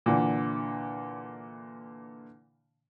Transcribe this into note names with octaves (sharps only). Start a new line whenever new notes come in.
A#2 D3 E3